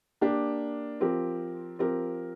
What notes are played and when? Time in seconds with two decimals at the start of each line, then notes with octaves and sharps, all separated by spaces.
0.21 A#3 D4 G4
1.00 F3 C4 G4 A#4
1.79 F3 C4 G4 A#4